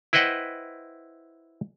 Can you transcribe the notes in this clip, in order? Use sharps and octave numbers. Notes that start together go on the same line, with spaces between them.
E4 B4 C5 D#5 F#5 G5